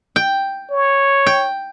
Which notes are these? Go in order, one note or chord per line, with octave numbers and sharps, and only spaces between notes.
G5
C#5
G5